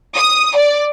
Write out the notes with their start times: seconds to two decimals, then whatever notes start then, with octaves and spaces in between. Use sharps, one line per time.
0.16 D#6
0.56 D5